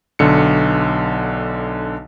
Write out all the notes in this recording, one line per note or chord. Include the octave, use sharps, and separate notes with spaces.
B1 D3 C#7